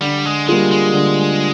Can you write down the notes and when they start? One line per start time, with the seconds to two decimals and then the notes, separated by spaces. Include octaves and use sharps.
0.01 D3 G3
0.25 G#3
0.48 G3 G#3 A#3 F4 G#4
0.71 G#3
0.93 D3